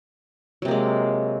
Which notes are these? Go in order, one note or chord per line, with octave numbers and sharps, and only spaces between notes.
C3 F#3 G#3 A#3